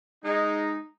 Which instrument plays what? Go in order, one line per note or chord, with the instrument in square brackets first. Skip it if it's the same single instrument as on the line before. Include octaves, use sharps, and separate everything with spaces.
[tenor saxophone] G#3 [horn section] D#4